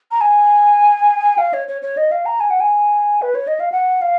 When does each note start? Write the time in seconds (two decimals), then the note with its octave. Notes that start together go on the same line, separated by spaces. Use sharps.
0.11 A#5
0.21 G#5
1.38 F5
1.53 C#5
1.68 C#5
1.82 C#5
1.97 D#5
2.11 F5
2.26 A#5
2.40 G#5
2.50 F#5
2.60 G#5
3.22 B4
3.35 C#5
3.47 D#5
3.60 F5
3.72 F#5
4.01 F5